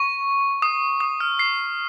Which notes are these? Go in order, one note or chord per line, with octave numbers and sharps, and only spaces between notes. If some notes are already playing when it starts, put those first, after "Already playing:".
Already playing: C#6
D#6
D#6
F6
C7